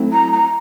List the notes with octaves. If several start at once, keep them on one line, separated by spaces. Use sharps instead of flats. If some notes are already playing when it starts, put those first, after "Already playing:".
Already playing: F#3 A3 C4 E4
A#5
A#5